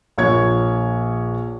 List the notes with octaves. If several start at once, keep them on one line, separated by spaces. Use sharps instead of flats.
A#1 A#3 C#5 C#6 G#6